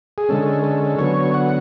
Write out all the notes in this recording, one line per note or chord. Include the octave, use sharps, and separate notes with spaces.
G#4
D3 G#3 C#4 A4
A4
D3 F#3 B3 C#5
F#5